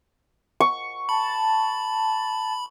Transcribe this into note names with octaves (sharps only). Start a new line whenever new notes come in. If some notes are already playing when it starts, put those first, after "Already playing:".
C#6
A5 B5